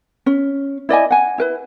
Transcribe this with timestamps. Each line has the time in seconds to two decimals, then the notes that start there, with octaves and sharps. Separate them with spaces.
0.26 C#4
0.89 E4 D5 D#5 G#5
1.11 F#5 G#5
1.38 E4 A#4 B4